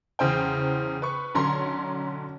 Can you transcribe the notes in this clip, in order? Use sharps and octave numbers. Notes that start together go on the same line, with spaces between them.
E2 C#3 C5 G5
B4 C#6
B1 D3 C#4 C#5 A#5 C6